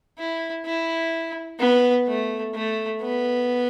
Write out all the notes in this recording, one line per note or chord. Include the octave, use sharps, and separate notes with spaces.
E4
E4
B3
A3
A3
B3